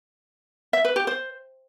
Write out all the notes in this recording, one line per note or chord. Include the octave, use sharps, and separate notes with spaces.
E5
B4
G4
C5